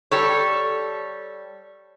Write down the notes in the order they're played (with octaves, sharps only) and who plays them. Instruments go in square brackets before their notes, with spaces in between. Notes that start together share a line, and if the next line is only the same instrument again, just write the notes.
[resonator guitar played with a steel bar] G3 A4 C#5